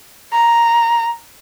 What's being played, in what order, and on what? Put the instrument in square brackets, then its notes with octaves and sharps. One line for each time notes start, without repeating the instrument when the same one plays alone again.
[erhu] A#5